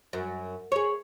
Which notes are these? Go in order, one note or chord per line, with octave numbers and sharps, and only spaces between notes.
F#2
G#4 C#5